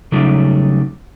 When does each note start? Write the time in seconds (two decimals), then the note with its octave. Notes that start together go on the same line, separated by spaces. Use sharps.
0.12 C#3 F#3 G3 A3 D#4 G4